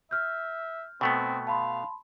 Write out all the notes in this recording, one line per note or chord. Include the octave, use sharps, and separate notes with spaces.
E5 F6 G6
B2 A3 B3 C4 G5
F5 A5 B5 C6